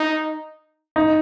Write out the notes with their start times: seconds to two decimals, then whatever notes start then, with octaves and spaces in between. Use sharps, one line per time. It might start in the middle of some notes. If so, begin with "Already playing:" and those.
Already playing: D#4
0.96 D#4